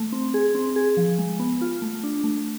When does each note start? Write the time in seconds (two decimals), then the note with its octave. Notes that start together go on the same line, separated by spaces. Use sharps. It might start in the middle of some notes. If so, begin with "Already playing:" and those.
Already playing: A3
0.12 C4
0.34 G#4
0.55 C4
0.76 G#4
0.97 F3
1.18 G#3
1.39 B3
1.61 F4
1.82 A3
2.03 D4
2.24 A3